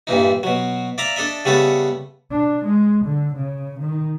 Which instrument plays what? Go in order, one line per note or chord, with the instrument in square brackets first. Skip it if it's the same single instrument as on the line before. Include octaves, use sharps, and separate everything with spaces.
[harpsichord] G2 A#2 E3 D#4
B2 F#3
D5 E5 F5 A#5
D4 A4 D#5 E5
C#3 G3 A3 B3 A4 B4
[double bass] D4
G#3
D3
C#3
D#3